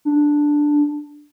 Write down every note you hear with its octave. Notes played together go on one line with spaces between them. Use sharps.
D4